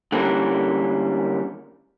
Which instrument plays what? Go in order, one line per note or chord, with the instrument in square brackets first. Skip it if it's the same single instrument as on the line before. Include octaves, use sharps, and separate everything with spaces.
[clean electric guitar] D3 E3 G3 A#3 C#4 A#4